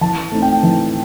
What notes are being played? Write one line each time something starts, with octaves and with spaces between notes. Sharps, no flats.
E3 A5
A3 C4 D#4
G5
E3